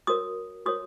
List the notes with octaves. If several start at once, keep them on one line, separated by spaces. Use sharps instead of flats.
F#4 A#4 C#5 D#6
F#4 A#4 C#5 D#6